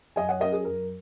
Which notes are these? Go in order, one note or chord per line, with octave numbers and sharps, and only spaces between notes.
F#2 D#5 G#5
C#5 F#5
F#3 C#4 A#4 D#5
G#4
F#2 A#4